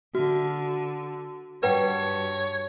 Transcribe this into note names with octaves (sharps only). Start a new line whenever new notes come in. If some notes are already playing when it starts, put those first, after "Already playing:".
D3 F#4
G2 B4 C#5 F#5 G5